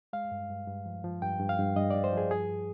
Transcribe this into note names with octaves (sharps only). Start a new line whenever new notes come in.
G#3 F5
G2
G2
G2
F3
F3
G2 G5
G2
F5
G2
G2 D#5
G2 D5
C5
F3 G#4
G2 G#4